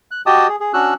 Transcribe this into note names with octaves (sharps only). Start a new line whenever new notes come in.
F#6
F#4 G4 D#5 G5 A5 D#6
G#4
G#4
C#4 D4 F#4 E6 F#6